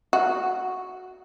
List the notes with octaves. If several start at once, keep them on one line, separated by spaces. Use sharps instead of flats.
F#4